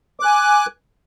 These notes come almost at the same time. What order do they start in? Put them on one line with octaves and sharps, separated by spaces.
D6 F#6 G#5